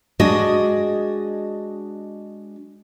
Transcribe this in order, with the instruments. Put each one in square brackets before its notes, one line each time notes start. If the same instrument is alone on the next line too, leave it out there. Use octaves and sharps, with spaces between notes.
[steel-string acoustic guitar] G#3 D4 F#4 D#5